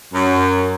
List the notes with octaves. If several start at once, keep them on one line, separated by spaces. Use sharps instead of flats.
F#2